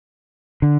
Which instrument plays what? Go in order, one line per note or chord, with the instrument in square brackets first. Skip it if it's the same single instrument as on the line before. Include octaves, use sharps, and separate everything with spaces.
[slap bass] D3